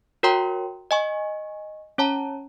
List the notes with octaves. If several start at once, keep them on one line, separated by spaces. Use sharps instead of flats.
F#4 A#4 C#5 G5 A#5 C6
D#5 G#5 C#6
C#4 C#5 A5 A#5